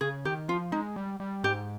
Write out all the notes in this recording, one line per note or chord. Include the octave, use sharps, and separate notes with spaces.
C#3 G#4
D#3 G4
F3 F4
G#3 D#4
G3
G3
G#2 G4